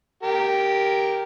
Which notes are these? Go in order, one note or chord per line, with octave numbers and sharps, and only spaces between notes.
G4 A#4